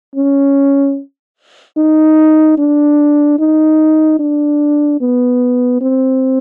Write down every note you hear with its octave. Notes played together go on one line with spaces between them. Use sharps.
C#4
D#4
D4
D#4
D4
B3
C4